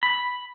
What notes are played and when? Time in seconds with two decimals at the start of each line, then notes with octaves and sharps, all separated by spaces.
0.03 B5